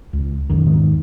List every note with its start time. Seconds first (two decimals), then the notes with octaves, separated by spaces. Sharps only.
0.13 C#2
0.50 B1 F#2 D#3
0.67 E2 G#2 D#3